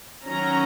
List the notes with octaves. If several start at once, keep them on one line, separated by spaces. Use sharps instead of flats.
D#3 F#3 C#4 A#5